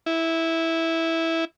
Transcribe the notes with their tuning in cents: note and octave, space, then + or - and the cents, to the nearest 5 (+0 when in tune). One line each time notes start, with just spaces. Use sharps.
E4 -10